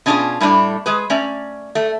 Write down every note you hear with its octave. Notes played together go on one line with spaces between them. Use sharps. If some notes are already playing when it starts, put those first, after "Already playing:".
B2 C#4 D4 E4 F4 G#4
A2 G3 A3 D4
G#3 G#4 B4
A3 C#4 D5
A3